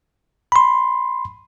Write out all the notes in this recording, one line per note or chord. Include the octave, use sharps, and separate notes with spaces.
B5 C6